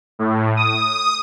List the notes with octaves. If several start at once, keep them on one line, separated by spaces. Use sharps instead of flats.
A2
D#6